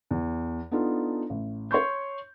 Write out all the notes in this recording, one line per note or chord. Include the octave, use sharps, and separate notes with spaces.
E2
B3 D4 D#4 F4 A4
A1
C#5 C6 C#6 G6